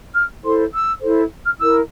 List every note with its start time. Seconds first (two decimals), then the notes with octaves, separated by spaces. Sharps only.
0.14 F6
0.43 E4 A4 C5 C6
0.72 E6
1.00 E4 A4 C5
1.44 F6
1.58 E4 A#4 E6